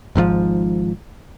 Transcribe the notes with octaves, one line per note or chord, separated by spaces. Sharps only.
G#1 G#2 D3 F3